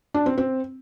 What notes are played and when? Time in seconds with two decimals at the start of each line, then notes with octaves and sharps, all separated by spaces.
0.14 D4
0.26 C4
0.38 C4